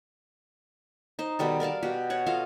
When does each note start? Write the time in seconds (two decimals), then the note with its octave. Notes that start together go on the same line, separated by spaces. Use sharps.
1.19 D#4 C5
1.39 B2 D#3 G3 A4
1.60 A#4 D5 F5 A5
1.83 B2 F#4 G4
2.10 C#5 F#5
2.26 F4 A4 D#5 F5